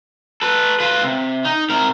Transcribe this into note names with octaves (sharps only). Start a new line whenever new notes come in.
A4 B4
F4 B4
C3
D#4
C3 A#4